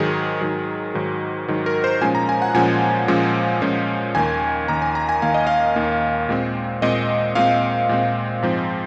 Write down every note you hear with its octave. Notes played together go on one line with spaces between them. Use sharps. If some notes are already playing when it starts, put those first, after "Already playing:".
Already playing: G#2 D#3 F#3 G#4
G#2 D#3 F#3
G#2 D#3 F#3
G#2 D#3 F#3
A#4
C5
A#2 F3 G#3 C#4 G#5
A#5
G#5
F#5
A#2 F3 G#3 C#4 G#5
A#2 F3 G#3 C#4
A#2 F3 G#3 C#4
D#2 D#3 A#3 G#5
D#2 D#3 A#3 A#5
G#5
A#5
G#5
D#2 D#3 A#3 F5
D#5
F5
D#2 D#3 A#3
A#2 G#3 C4
A#2 G#3 C4 D#5
A#2 G#3 C4 F5
A#2 G#3 C4
G#2 F3 G#3 C4